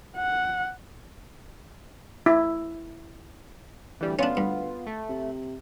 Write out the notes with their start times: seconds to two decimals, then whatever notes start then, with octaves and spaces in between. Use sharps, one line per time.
0.17 F#5
2.26 E4
4.01 D2 E3 G3
4.19 B3 C#4 D4 F4
4.37 G2
4.87 A3
5.09 C3